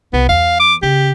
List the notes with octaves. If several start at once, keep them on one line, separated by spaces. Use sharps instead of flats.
C2 B3
E2 F5
D6
C#3 G4